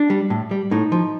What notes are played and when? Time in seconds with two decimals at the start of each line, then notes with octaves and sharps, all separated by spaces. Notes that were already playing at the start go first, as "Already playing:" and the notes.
Already playing: D4
0.10 G3
0.30 A2
0.51 G3
0.71 A2 D#4
0.92 F3